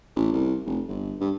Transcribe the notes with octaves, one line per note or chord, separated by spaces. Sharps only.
A1
C2
F1
G1
G2